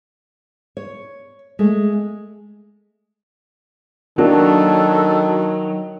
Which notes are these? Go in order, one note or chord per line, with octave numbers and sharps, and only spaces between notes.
C#5
G#3 A3
D#3 F#3 A#3 D4 F#4 A4